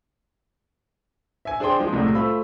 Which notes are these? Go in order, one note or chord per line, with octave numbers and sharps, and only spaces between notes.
E5 G#5
D4 G#4 C5 G5 C6
F3 G#3
C2 A2 C3 G3 G#3
A3 F4 C5 B5 E6